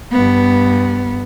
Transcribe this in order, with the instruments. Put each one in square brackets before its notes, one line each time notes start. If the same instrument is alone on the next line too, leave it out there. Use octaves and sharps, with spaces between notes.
[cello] G2 B3